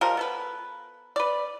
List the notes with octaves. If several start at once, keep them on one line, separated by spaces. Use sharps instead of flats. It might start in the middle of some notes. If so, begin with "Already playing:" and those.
F3 G3 G#3 A#4
B3 A4 B4
B4 D5